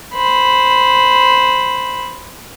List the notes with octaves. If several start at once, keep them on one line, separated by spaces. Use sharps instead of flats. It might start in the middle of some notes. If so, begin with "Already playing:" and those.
C5 B5